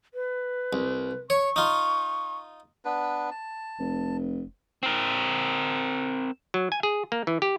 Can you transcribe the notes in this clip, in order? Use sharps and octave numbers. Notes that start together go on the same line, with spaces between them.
B4
C2
C#5 C#6
D#4 F4
B3 D4 B4
A5
F1
C4 A#4
F#3
G#5
G#4
A#3
E3
G4